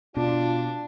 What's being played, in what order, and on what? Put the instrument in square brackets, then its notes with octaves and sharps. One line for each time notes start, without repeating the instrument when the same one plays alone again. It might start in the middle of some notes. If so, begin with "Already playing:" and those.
[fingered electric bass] B2 [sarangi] D4 [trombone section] F4